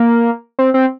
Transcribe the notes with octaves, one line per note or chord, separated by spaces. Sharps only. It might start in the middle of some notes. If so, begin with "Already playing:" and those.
Already playing: A#3
C4
C4